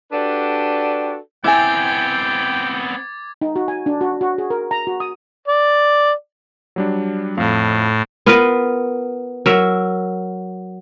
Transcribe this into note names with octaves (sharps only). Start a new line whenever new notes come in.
D4 F#4 G4 A4 B4 D5
B3 C4 E4 G5 G#5 D6 G#6 A6
D#4
F#4
G#5
D4
F#4
F#4
G#4
A#4
A#5
F#4
D#6
D5
F#3 G3 D4
F2 A2 F5
B3 F4 A#4 B4
F#3 A#4 E5